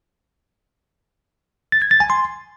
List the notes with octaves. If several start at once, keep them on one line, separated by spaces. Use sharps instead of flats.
A6
G#6
A6
G#5
C6